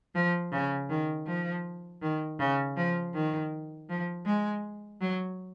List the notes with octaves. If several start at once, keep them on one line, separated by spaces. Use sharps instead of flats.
F3
C#3
D#3
F3
D#3
C#3
F3
D#3
F3
G#3
F#3